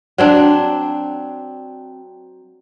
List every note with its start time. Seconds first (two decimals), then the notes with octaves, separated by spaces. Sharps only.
0.18 F#3 C4 D4